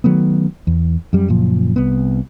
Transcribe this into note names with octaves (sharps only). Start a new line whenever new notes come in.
D#3 F#3 A3 B3
E2
F#2 G3
F#1 F#2 A#2 F3
C2 B3